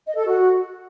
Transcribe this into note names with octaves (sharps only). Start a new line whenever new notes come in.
D#5
A4
F#4